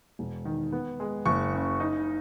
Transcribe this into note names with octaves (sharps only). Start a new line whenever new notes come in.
E1
D#3
B3
G#3
F#1 C#6
C#3
D#4